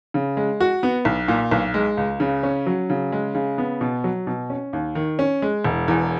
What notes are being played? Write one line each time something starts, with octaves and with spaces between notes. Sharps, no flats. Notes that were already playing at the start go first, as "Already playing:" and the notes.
C#3
G#3
F#4
B3
B1
A#2
B1
G#3
C#2
C#3
C#4
F#3
C#3
G#3
C#3
B3
B2
F#3
B2
C#4
D#2
D#3
C#4
G#3
E1
E2